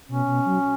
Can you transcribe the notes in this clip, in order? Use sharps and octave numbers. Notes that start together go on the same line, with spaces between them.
B2 C#4
B2
F#3